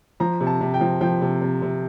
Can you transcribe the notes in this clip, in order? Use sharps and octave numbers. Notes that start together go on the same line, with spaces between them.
F3 A#5
C3
A5
C3
G5
F3
F3 G5
C3
C3
C3